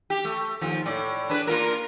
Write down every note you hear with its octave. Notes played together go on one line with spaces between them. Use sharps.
G4
A3
D#2 F3
A2 D5
D4 G#4 B4
A#3 F4 A#4